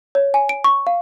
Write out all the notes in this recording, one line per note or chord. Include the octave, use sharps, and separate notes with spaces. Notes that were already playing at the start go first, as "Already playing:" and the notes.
C#5
G#5
D7
C#6
F5